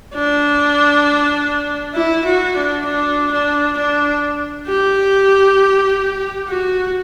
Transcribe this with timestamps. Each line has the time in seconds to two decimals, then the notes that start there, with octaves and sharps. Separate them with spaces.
0.14 D4
1.95 E4
2.25 F#4
2.56 D4
2.85 D4
3.32 D4
3.77 D4
4.67 G4
6.48 F#4